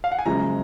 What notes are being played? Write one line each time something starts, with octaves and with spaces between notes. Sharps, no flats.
F5
F#5
G#5
F#1 F#2 F3 G#3 A#5